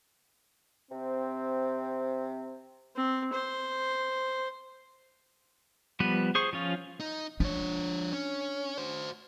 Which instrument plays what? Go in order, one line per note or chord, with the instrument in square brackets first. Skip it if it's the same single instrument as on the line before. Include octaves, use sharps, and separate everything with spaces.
[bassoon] C3 [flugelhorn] C4
[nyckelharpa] C4
C5
[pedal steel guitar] F3 G3 B3 B4
G#4 C5 C#6
F3 C#4 F4
[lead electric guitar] D#4
[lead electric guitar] F3 C#5 [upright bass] D4
[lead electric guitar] C#4
F#4 C5